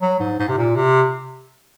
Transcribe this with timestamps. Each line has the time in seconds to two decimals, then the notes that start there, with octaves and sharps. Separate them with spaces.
0.02 F#3
0.20 G#2
0.39 G#2
0.49 C3
0.58 A#2
0.76 C3